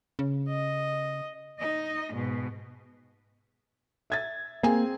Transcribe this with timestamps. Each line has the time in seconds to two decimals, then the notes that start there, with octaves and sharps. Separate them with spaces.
0.19 C#3
0.49 D#5
1.59 D#4 D#5
2.14 G#2 B2
4.10 E5 G#6 A6
4.63 A#3 C4 G#4 G#5